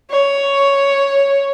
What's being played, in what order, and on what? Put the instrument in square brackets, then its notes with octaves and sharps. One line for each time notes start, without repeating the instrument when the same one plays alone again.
[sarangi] C#5